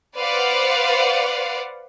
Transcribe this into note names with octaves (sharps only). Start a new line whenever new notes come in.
B4 C5 D5 F5 F#5